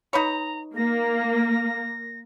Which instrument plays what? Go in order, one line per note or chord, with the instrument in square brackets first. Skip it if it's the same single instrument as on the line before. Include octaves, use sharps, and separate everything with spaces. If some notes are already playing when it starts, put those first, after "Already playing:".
[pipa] D#4 B4 C#5 [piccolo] A#5
[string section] A#3 [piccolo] A#6